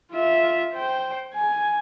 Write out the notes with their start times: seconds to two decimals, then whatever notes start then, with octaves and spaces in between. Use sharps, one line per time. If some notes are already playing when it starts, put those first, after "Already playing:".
0.11 F4 E5
0.73 C5 G5
1.34 G#5